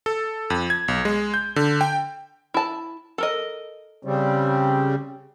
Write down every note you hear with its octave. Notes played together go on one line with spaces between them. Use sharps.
A4
F2
G#6
B1
G#3
G6
D3
G5
E4 A5
A4 A#4 D#5
C#3 G3 C4